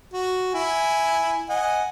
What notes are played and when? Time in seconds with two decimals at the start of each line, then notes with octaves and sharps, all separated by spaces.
0.13 F#4
0.54 E4 G#5
1.50 D#5 F#5 G#5